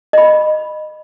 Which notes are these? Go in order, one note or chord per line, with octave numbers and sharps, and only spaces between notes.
D#5 B5